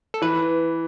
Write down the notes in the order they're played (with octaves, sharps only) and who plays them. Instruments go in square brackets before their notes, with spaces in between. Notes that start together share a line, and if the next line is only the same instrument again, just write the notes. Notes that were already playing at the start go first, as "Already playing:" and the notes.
[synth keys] A4
[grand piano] E3 [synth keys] B4